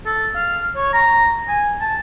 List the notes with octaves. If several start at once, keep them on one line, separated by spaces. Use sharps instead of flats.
A4
F5
C#5
A#5
G#5
A5